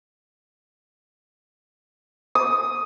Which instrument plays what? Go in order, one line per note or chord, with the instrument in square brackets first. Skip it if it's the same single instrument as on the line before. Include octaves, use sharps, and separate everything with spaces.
[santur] D#6